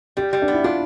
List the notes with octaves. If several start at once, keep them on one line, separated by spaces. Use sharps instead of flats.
G3 G4
G3
D4
B3
E4
D4 F4